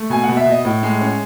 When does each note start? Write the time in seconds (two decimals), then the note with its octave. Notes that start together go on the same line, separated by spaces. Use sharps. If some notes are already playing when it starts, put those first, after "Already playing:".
Already playing: A3
0.10 B2 G#5
0.24 F#5
0.29 B2
0.37 E5
0.46 B2
0.51 D#5
0.65 A2
0.83 G#3
1.01 C#4